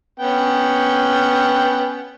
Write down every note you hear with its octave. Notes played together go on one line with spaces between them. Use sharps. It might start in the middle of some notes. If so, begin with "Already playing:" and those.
B3 C#4 G5